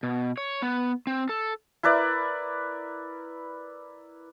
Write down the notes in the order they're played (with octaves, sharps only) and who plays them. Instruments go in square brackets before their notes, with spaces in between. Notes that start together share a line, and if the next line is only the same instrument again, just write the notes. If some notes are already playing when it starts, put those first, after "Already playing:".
[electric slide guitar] B2
C#5
B3
C4
A4
[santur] E4 A#4 B4 D5